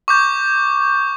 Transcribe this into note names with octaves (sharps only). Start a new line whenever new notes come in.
C#6 D6 G6